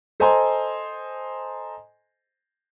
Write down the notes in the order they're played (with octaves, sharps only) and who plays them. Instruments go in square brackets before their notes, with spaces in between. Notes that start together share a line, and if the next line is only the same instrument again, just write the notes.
[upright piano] A4 C5 D#5 G#5 A#5 C6